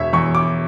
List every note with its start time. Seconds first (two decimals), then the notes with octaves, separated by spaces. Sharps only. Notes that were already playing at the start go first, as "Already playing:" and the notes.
Already playing: E1 C#5 E5
0.13 E2 C#6
0.35 D6